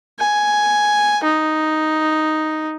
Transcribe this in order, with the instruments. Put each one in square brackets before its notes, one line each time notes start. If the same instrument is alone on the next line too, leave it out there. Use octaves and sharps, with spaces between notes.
[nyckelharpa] G#5
D#4